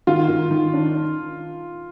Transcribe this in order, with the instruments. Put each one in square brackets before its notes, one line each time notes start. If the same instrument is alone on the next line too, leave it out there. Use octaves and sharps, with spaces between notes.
[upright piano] D#3 [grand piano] F4
[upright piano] D#3
D#3
D4